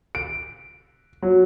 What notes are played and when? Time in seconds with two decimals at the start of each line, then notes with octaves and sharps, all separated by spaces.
0.15 D7
1.22 F#3